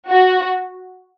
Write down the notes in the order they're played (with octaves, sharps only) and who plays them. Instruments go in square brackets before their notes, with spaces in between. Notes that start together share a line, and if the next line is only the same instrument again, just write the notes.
[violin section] F#4